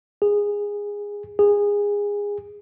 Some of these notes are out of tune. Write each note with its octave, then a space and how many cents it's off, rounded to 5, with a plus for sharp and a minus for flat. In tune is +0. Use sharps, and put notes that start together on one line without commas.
G#4 -15
G#4 -20